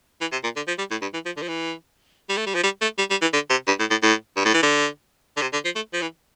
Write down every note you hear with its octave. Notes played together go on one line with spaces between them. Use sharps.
E3
C3
A#2
D3
F3
G3
A2
G2
E3
F3
D3
F3
E3
G3
A3
G3
F3
G3
A3
G3
G3
E3
D3
C3
G2
A2
A2
A2
G2
A2
E3
D3
D3
C3
D3
F3
A3
F3
E3